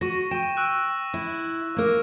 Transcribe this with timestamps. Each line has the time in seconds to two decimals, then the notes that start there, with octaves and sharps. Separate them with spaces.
0.01 F#4 C#6 A#6
0.31 G5 C#6 E7
0.57 C#6 E6 F#6
1.14 E4
1.77 A#3 A#4